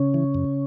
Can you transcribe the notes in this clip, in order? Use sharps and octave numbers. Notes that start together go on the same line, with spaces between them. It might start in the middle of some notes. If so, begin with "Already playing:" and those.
Already playing: C#3 C#4
E3
F#2